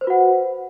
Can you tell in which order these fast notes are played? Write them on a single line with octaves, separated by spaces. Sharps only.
C5 B4 F#4 F#5